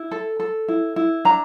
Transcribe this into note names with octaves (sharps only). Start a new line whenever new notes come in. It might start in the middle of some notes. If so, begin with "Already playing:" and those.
Already playing: E4
A4
A4
E4
E4
D4 A#5